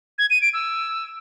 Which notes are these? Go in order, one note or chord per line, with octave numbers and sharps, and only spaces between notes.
G#6
D#7
D7
E6